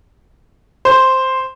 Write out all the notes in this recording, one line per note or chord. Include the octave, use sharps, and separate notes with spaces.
C5